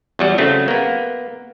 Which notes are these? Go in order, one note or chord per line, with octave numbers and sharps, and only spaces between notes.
E2 F#3 G3
C#3 F#3 A3 C4
A#3 B3